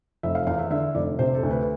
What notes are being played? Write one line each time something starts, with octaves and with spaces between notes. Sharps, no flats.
F1 E5
F5
E2 F5
E5
D3 E5
F1 D5
C3 C5
A4
D2
B4